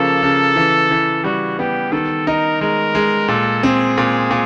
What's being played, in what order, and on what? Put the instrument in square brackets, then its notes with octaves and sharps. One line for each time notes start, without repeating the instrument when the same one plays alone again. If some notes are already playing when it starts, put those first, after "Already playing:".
Already playing: [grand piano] C#3 F3 A#3 [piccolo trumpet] A4
[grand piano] C#3
E3
E3
[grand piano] G3 [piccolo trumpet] F#4
[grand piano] B3 [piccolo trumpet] G4
[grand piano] D#3 [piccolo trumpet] A4
[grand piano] D#4 [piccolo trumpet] A#4
[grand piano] G#3 [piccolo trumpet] A#4
[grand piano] G#3
[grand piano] A#2 [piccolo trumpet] A4
[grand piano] C4 [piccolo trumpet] G#4
[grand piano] A#2
A#2